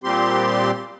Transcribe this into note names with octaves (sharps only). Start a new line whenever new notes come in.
A#2 G3 C4 G4 C6